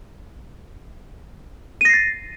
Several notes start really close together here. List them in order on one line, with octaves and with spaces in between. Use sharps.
D#7 A#6 C7 A6